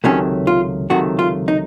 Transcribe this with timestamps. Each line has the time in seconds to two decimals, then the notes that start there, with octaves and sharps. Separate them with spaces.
0.04 C#2 C3 D#3 F#3 A3 C#4
0.47 F4
0.90 C#2 C3 D#3 F#3 A3 F#4
1.19 F4
1.48 D#4